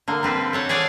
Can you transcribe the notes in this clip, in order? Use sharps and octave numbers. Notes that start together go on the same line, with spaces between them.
D3 A#3
G3 C4 B4
A4 C#5 F#5
G#4 C#5 D5 F5 F#5 G#5